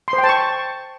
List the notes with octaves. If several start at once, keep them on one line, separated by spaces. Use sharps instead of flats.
C6
C5
G5
A5
C#6